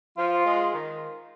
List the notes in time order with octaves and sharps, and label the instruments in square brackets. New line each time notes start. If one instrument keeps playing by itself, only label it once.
[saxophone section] F3 [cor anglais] F4
[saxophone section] G#3
D#3